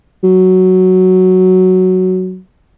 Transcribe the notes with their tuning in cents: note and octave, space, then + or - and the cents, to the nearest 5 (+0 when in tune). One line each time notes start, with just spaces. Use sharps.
F#3 +0